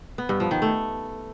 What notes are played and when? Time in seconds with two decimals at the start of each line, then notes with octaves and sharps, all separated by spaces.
0.18 B3
0.29 G2
0.40 F3
0.51 D#3
0.62 A3